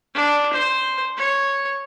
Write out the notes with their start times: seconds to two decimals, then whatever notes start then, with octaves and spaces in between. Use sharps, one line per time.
0.14 D4
0.52 C5
1.17 C#5